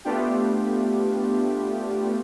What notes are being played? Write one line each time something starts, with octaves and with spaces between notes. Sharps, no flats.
A3 B3 D4 F4 G4